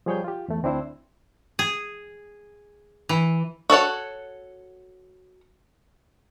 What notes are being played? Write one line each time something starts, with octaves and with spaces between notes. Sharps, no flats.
F3 G3 G#4 C#5 G5 G6
F4 G4
E2 A3
D2 C4 D4 E4 C5
G#4
E3
F#4 A4 C#5 F#5